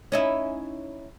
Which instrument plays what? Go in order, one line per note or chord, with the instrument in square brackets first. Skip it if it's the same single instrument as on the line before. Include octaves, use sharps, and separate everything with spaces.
[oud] C#4 D#4 E4